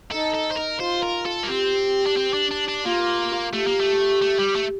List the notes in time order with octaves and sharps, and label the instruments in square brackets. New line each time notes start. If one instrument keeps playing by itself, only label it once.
[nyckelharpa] D#4 [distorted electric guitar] A4
[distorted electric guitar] A4
C5
A#4
[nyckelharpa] F4 [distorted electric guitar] C5
[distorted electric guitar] A#4
A4
A#3
[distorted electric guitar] C4 [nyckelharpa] G4
[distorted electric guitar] D4
C4
D4
D4
D4
[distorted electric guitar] A#3 [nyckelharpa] F4
[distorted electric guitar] A3 [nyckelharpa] G4
[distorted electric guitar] A#3
A3
A3
G3
A3